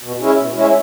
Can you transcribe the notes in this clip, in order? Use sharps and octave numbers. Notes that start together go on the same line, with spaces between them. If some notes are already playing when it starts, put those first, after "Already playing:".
B2
G#3 C#4 E4
B2
G#3 C#4 E4